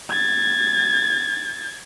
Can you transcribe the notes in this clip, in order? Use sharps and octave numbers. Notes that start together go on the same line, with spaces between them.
G#6 A6